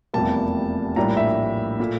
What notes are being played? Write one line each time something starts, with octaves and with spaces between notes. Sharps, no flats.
F1 E2 C3 G3 A#3 A5
A#1 A2 G3 A#3 D4 A#5
E5
A#2 A3